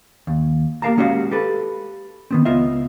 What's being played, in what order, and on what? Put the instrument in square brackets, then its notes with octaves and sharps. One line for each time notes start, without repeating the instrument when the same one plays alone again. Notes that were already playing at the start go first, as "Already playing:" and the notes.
[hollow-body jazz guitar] D#2
A#3 G4 A#4 F5 A5 A#5
G#3 C#4 F#4 G4 C#5 F5
G4 A4 B4
D#3 B3 C4
C#2 B3 F4 D#5 E5